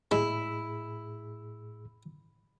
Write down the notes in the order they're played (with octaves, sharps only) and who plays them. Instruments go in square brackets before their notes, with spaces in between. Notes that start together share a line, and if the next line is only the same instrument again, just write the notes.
[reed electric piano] A2 G#4 [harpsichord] G#3 [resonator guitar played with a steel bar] E4